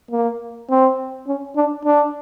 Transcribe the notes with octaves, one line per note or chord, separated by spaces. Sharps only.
A#3
C4
C#4
D4
D4